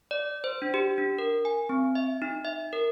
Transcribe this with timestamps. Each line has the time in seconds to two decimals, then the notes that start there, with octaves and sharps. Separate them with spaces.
0.11 D5
0.44 C5
0.62 D4
0.74 G4
0.98 D4
1.18 A#4
1.45 G#5
1.69 C4
1.95 E5
2.22 D#4
2.45 E5
2.73 A#4